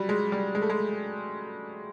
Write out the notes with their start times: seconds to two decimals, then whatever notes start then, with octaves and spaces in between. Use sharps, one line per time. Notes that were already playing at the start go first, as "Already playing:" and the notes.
Already playing: F#3 G3
0.09 G#3
0.32 G3
0.55 G#3
0.62 A3
0.70 G#3